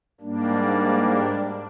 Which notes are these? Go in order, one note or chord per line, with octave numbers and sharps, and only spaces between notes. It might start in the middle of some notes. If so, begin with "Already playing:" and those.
G#2 G3 A#3 D4